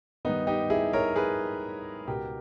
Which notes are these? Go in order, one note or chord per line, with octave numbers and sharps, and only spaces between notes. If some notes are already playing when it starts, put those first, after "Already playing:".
G2 D#3 B3 D#4
D#4 G4
E4 G#4
A#4 C#5
G#4 B4
C#2 B2 G4 A#4